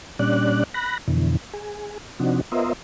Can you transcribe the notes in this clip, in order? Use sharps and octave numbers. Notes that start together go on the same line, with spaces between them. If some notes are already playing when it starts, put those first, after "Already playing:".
A#2 G3 C#4 D4 D5 F#6
B5 F#6 A#6
F2 B2 D3 E3
G#4
C3 F3 C4 D4 D#4 F#4
B3 F4 A#4 C5 D#5 E5